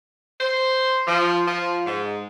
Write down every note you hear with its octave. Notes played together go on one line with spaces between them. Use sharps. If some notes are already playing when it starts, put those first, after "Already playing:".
C5
F3
F3
G#2